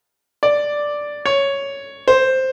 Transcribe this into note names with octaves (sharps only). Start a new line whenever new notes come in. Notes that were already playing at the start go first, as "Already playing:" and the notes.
D5
C#5
C5